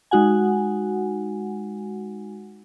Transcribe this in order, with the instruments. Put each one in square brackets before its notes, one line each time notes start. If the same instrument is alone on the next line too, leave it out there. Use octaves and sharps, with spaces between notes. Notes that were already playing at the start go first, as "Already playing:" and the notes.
[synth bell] G#3 D#4 F#4 F#5 G#5